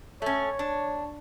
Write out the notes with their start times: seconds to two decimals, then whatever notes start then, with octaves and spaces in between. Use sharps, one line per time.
0.22 A3 C#4 C#5
0.59 D4